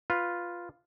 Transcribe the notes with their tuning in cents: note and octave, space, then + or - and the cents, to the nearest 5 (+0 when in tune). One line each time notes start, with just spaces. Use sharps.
F4 +0 B4 +0